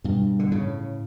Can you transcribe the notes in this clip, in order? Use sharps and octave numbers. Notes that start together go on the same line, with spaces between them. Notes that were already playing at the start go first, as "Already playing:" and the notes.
G2 B2
D3
A2 C#3